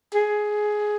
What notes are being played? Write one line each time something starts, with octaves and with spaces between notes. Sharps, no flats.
G#4